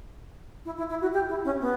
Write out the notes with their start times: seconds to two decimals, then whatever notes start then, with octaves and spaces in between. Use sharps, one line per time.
0.65 E4
0.78 E4
0.90 E4
1.01 F#4
1.13 G4
1.29 E4
1.45 C#4
1.61 B3